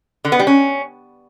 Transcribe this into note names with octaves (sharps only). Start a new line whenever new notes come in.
D3
B3
G3
C#4